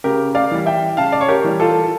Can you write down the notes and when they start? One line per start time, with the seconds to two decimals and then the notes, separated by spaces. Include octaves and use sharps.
0.04 C#3 G4 A#4
0.35 D5 F5
0.51 E3 G3
0.66 E5 G5
0.97 C#3 F5 A5
1.12 D5
1.21 C#5
1.28 G4 A#4
1.44 E3 G3
1.60 F4 A4